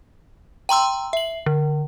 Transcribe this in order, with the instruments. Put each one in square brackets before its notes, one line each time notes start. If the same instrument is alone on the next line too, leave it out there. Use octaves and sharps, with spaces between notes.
[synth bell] G5 A#5 C6 E6
E5 F#7
D3